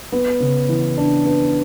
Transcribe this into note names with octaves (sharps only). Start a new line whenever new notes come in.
B3
C#3
E3
D4
B3